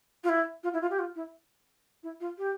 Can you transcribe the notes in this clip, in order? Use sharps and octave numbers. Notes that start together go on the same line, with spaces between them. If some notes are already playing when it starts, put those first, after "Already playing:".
F4
E4
F4
E4
F4
G4
F4
E4
E4
F4
G4